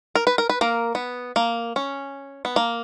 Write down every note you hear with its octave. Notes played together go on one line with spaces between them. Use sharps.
A#4
B4
A#4
B4
A#3 A#4
B3
A#3
C#4
B3
A#3